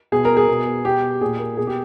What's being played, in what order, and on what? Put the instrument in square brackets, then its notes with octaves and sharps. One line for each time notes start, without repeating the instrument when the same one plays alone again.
[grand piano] B2 G#4
A#4
G#4
B2
B2 G4
A#2 G#4
A#4
B2 G#4
G4